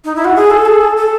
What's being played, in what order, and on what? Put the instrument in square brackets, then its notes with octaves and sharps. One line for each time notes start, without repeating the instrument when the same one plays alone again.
[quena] D#4
E4
F#4
G#4
A4
G#4
A4
A4